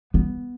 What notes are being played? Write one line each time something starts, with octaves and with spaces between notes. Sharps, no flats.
B3